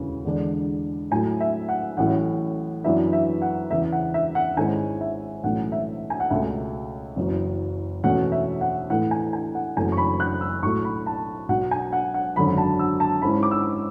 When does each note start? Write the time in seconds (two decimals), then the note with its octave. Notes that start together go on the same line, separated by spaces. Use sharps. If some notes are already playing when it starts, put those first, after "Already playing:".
Already playing: E1 D2 C#3 E3
0.25 E2 D3 G#3 D4
1.11 A2 F#3 A3 E4 G#5
1.40 E5
1.69 F#5
1.97 A1 A2 F#3 C#4 E4 F#5
2.84 F#2 E3 B3 D4 E5
3.13 E5
3.42 F#5
3.70 E2 C#3 E3 E5
3.92 F#5
4.14 E5
4.35 F#5
4.57 G#1 G#2 G#3 C#4 E4 G#5
5.01 E5
5.43 B1 A2 E3 A3 C#4 F#5
5.72 E5
6.10 G#5
6.20 F#5
6.30 C#2 B2 A3 E5
7.16 F#1 F#2 E3
8.03 E2 B2 A3 C#4 F#5
8.32 E5
8.61 F#5
8.90 A2 E3 A3 F#5
9.11 G#5
9.33 G#5
9.55 F#5
9.77 F#1 F#2 E3 A3 C#4 G#5
9.92 C#6
9.97 B5
10.20 F#6
10.41 E6
10.62 B1 A2 F#3 A3 E4 C#6
10.84 B5
11.06 A5
11.49 B1 B2 F#3 F#5
11.71 G#5
11.92 F#5
12.14 F#5
12.36 G#1 F#2 D3 F#3 B5
12.58 A5
12.79 E6
13.00 A5
13.22 G#2 G#3 C#4 E4 B5
13.43 D6
13.51 E6